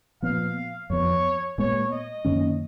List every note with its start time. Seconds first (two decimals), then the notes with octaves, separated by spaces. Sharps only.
0.22 A#2 F3 B3 F5
0.90 F2 F3 B3 C#5
1.58 A#2 G#3 B3 C#5
1.92 D#5
2.25 F#2 D#3 A#3 C#4